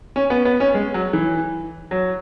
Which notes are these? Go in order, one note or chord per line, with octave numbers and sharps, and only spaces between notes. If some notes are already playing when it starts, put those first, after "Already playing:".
C#4
B3
B3
C#4
G#3
F#3
E3
F#3